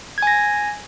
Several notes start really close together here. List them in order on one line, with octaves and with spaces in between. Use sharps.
G#6 G#5 A#6